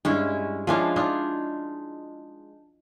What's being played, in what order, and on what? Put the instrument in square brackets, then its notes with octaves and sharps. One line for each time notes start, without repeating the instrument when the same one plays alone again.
[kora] G2 [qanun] G#3 C#4 E4
[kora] F3 C#4 D4 [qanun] G#3 E4 F5
[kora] D4 D#4 F4